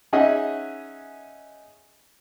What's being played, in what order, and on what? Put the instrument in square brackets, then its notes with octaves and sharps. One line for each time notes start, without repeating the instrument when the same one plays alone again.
[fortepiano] C#4 D#4 G#4 D#5 E5 F#5